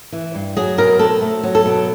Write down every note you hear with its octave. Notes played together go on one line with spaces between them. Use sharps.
E3
G2
F#3 G#4
B2 A#4
C4 A4
A3
F#3
A4
B2